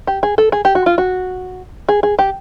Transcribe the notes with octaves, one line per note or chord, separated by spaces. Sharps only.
G4
G#4
A4
G#4
G4
F#4
F4
F#4
G#4
G#4
G4